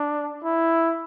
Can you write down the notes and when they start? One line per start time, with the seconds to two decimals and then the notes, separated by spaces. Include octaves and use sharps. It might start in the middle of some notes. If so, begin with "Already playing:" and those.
Already playing: D4
0.44 E4